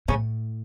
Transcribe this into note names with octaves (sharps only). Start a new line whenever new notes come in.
A2 C#3 C#4